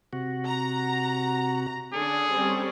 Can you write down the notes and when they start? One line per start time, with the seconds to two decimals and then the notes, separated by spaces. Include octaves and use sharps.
0.13 C3 F#4
0.46 A#5
1.94 D3 C#4 D4 G#4 A4
2.31 G3 C4 C#4